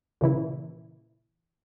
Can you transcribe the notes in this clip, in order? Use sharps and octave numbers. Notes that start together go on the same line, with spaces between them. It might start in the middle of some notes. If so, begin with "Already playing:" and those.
A#2 C#3 E3 E4